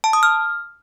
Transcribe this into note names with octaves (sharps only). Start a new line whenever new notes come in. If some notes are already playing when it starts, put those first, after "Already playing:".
A5
D#6
F6